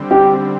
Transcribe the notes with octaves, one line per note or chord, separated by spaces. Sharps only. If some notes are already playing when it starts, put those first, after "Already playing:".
Already playing: D3 G3 C4
G4